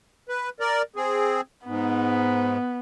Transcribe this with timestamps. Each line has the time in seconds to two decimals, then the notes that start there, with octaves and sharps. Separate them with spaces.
0.29 B4
0.60 A#4 D5
0.96 C4 G#4
1.66 G#2 B3